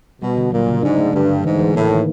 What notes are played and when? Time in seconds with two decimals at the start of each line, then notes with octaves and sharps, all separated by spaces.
0.21 B2 G3
0.37 D3
0.52 A#2 F#3
0.68 C#3
0.83 G#2 D4
0.98 A3
1.13 G2 D3
1.29 D3
1.44 G#2 E3
1.59 E3
1.75 A2 A#3
1.90 D#3